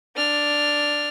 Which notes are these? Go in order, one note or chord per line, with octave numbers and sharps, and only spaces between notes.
D4 F6